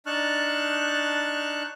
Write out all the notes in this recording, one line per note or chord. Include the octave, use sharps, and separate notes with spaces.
D4 D#4 A5 C#6 F6 F#6